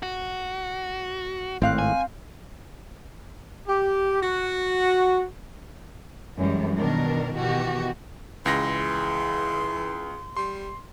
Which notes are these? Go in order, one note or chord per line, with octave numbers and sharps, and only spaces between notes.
F#4
G#1 A2 C4 F5 F#6
G#5
G4
F#4
F#2 E3 G3 G#3
B2 D#3 D4 A#4
B2 D#3 E3 F#4 G4
C#2 E3 G#4 C6 A#6
G3 C6